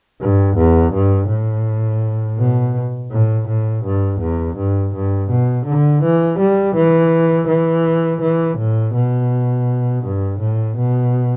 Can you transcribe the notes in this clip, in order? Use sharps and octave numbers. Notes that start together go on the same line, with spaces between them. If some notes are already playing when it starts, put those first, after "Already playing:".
G2
E2
G2
A2
B2
A2
A2
G2
E2
G2
G2
B2
D3
E3
G3
E3
E3
E3
A2
B2
G2
A2
B2